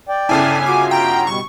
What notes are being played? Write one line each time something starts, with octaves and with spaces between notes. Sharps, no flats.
D5 G5
G1 C#3 E4 G#5 A5
F4 F#4 D6
G5 A#5
B2 G3 C#6